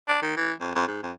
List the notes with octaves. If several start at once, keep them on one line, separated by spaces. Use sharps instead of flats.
D4
D#3
E3
F2
F2
G#2
F2